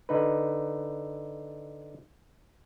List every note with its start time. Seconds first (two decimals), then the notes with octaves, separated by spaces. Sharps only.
0.09 D3 D#4 B4